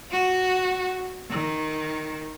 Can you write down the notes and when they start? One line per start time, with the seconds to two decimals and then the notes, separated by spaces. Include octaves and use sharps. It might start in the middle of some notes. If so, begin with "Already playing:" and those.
0.11 F#4
1.30 D#3